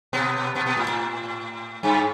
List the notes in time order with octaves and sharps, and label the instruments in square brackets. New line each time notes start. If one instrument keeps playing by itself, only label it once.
[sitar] B2 B3
B2 B3
B2 B3
A2
A2
G2